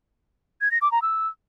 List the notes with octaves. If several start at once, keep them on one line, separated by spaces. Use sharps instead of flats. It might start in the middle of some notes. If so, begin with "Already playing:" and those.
G#6
A#6
D6
A#5
E6